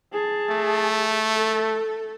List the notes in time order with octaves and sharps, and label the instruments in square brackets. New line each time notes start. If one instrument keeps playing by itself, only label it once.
[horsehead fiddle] G#4 A5
[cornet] A3
[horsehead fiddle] A4